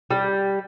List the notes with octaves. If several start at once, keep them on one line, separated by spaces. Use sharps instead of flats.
G3